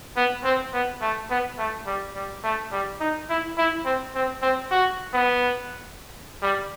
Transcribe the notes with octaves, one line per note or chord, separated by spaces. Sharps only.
B3
C4
B3
A3
B3
A3
G3
G3
A3
G3
D#4
E4
E4
C4
C4
C4
F#4
B3
G3